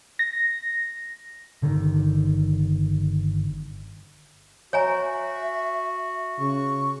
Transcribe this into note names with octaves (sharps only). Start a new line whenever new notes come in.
A#6
G1 D3 D#3
F#4 C#5 E5 G#5 A#5
C#3 C#6